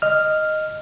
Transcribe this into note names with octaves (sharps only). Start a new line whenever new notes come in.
D#5 F6